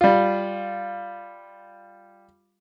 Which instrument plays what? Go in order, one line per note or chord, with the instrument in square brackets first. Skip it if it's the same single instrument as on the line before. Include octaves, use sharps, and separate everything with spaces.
[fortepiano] G3 F4